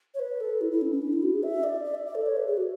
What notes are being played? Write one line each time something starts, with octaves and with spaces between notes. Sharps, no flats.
C#5
B4
A4
E4
E4
C#4
C#4
D4
E4
F#4
G#4
E5
D5
D5
E5
D5
A4
C#5
B4
G#4
F#4